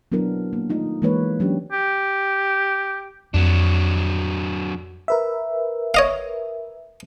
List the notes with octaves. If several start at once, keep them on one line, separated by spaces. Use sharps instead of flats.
F#3 B3 D4 E4 A#4
A#3
A3 D#4 F4
E3 G#3 A#3 D#4 B4 C#5
F#3 C#4 D4 G4
G4
F2 F#3 C4 D4
A#4 B4 E5
C#5 D#5 F5